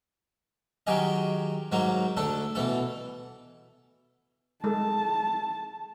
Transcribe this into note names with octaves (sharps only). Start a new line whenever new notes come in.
D#3 F#3 G4 G#4 D#5
G#2 F#3 A#3 D#4
D2 D4 A4
B2 E3 A4
G#3 A4 A5